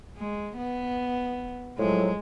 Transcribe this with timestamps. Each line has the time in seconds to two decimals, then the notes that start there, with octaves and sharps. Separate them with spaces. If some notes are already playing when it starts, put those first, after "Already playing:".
0.17 G#3
0.57 B3
1.78 A2 F3 F#3 G#3